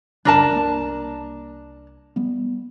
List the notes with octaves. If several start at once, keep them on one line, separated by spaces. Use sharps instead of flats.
C2 F#2 C#3 D4 A#4 A5
C2 A#3
G3 B3